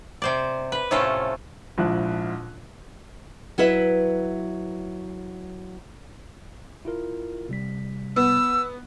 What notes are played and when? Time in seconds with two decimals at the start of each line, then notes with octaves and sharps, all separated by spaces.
0.22 C3 C5 D5
0.72 B4
0.91 A2 C3 A3 C#4 F4 A4
1.78 A#1 G#2 F3 E4 F#6
3.58 F#3 E4 B4 E5
6.85 E4 F4 A#4
7.49 C3 G3 B6
8.16 B3 E6